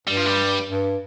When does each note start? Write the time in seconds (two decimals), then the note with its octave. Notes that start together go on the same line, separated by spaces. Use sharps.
0.07 G2 G3
0.17 F3
0.26 G3
0.69 G2